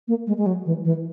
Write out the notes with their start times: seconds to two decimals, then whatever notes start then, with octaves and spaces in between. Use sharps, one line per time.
0.08 A#3
0.27 G#3
0.37 G#3
0.46 F#3
0.66 E3
0.85 E3